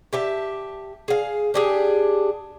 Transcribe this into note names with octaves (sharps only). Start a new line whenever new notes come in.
G4 E5 A5
G#4 F5
D4 G4 G#4